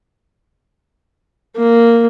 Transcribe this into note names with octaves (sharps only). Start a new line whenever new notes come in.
A#3